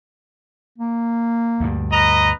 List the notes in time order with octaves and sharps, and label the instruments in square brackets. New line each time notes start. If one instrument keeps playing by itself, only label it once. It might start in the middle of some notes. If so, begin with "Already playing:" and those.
[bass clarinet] A#3
[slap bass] D2 G2
[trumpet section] B4 D#5 A#5